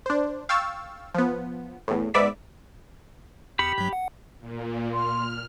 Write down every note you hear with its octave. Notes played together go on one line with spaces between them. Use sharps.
D4 C5
F5 G5 C#6 E6 A6
F3 B3
E2 A2
G#2 B3 D5 E5 B6
E2 G4 B5 C#7
G2 F#3
F#5
A#2
C6 F6